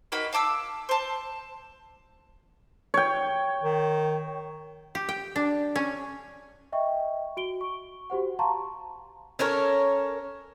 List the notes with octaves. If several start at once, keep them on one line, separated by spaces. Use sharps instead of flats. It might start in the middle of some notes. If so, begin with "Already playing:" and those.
A#3 D#4 F#4 B5
F5 A5 D6 E6
C5 A5
C#5 G5
D#3
G4
G5
D4
C#4
D#5 E5 G5 C#6
F#4 D7 G7
C#6
F#4 G4 C5 F#5
F5 A5 A#5 C6 C#6
C#4 A4 A#4 C#5